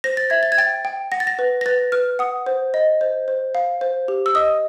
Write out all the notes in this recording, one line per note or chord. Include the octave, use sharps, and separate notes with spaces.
C5 A#6
A6
E5 G#6
A6
G#6
G5 A6
G5
F#5 A#6
A6
A#6
B4
A#6
B4 A6
B4 F6
F#5 D#6
C5
D#5
C5
C5
F5
C5
G4
E6
D#5 D#6